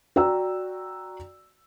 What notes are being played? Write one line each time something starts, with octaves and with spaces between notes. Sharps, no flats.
F#4 D5 G5 A#5 E6